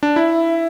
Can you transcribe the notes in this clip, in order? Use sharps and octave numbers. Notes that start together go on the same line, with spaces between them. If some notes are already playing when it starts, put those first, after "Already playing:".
D4
E4 E5